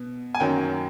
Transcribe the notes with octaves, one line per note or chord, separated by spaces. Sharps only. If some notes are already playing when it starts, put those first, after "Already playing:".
Already playing: B2 B3
G#5
F#2 D#3 F#3 A#3 C#4 G5